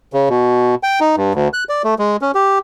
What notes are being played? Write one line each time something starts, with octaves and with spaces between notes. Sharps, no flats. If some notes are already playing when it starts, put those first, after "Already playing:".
C#3
B2
G5
D#4
G2
D2
F#6
D5
A3
G#3
C#4
G4